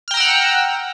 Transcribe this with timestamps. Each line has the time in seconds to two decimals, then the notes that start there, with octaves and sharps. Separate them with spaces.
0.08 F6
0.11 G5
0.14 A#5
0.17 E6
0.20 F#5